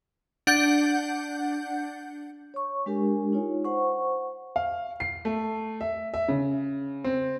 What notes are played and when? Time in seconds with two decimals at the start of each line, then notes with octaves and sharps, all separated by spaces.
0.47 D4 F#5 G6
2.54 C#5 C#6
2.86 G#3 D4 G4 A#4 G#5
3.33 D#4 F4 C#5
3.65 C5 F#5 C#6
4.56 F5
5.00 C7
5.25 A3
5.81 E5
6.14 E5
6.28 C#3
7.04 C4